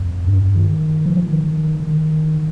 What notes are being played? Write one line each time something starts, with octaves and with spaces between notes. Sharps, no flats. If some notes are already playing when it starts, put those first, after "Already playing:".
Already playing: F2
G2
D#3
F3
D#3
D#3
D#3